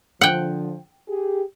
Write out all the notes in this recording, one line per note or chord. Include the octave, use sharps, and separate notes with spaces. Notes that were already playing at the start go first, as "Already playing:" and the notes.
D3 F3 F#5 G5
G4 G#4